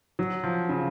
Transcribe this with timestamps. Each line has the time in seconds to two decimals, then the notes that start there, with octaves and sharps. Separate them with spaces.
0.19 F#3
0.44 F3
0.69 C#3